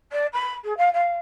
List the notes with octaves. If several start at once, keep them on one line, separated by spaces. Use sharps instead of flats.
D5
B5
G#4
F5
F5